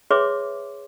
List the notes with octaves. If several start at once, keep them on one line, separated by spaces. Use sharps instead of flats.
G#4 B4 C#5 E5 C6 D6